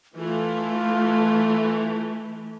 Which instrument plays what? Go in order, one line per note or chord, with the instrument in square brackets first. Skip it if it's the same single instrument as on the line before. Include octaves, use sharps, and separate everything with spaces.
[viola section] E3 A3 [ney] F4